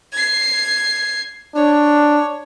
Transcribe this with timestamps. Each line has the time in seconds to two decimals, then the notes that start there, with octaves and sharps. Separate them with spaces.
0.12 G#6 C7
1.55 D4 C#5